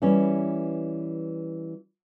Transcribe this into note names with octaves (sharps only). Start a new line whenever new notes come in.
E3 G3 C#4